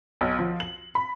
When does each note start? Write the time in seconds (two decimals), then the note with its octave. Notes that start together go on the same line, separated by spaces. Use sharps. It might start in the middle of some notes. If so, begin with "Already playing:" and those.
0.21 B1
0.39 F3
0.60 F#7
0.95 B5